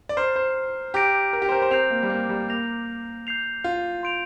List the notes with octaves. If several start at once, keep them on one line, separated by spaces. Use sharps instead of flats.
D5
C5 A#5 F6 C7
C5
G4 A#5 D6 G6 A#6 D7
A#4
G4
C5
A#4
C5
C4 A#5 G6 C7 F7
A#3
G3
A#3
G3
A#3 G6 A#6 F7
G6 C7 F7
F4
C6 G6 D7 F7